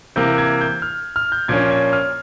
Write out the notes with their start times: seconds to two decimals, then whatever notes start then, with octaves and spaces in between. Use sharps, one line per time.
0.16 C3 E3 A#3 G6
0.38 G#6
0.61 G6
0.82 F6
1.16 F6
1.32 G6
1.48 A#2 F3 A#3 C#4 G#6
1.71 G#6
1.93 F6